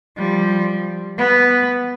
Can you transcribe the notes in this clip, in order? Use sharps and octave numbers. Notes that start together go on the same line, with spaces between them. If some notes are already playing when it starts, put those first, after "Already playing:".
F3 G3
B3